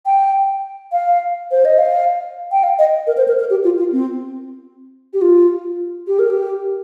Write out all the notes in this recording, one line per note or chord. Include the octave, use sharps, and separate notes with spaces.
G5
F5
C5
D#5
F5
G5
F5
D#5
A#4
C5
A#4
A#4
G4
F4
F4
C4
G4
F4
G4
A#4
G4